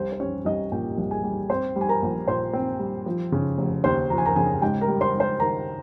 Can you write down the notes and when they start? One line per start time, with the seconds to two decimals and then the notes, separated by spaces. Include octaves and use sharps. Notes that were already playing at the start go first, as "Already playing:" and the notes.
Already playing: C2 C5
0.12 C5
0.20 G3 C#4 C#5
0.45 C2 D#4 D#5
0.72 A#2 G4 G5
0.98 C2
1.11 G#4 G#5
1.24 G3
1.50 C4 C5 C6
1.76 G3
1.81 G#5
1.89 A#4 A#5
2.02 A#1
2.28 A#2 C5 C6
2.53 C4
2.79 G3
3.06 F3
3.32 C#3
3.58 F1
3.84 D#2 C5 C6
4.10 F3 A#5
4.18 G#5
4.26 A#4 A#5
4.36 C#3 G#4 G#5
4.62 G#2 G4 G5
4.81 A#4 A#5
4.88 G3
5.01 C5 C6
5.14 G#2
5.20 C5 C6
5.40 D#3 A#4 A#5